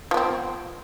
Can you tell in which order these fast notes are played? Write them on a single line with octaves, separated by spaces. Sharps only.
F3 B3 C4